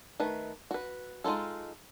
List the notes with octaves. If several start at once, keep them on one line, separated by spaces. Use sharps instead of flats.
D#3 A3 B4
F#4 B4
G#3 D#4 F4 A4